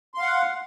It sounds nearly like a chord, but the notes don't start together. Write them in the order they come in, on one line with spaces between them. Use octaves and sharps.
C6 F5 F#5